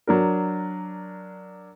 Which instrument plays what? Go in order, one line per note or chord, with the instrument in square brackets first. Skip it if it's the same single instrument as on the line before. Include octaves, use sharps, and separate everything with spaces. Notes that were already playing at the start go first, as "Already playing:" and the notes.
[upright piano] F#3 D4 A#4